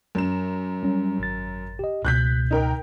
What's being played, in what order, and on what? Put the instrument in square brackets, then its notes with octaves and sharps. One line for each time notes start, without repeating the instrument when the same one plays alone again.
[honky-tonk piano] F#2 E7
[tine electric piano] G3 C#4
G#1 A6
G4 D#5
[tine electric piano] C#2 B2 [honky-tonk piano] F#6 G6 B6
[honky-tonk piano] D#4 A#4 G5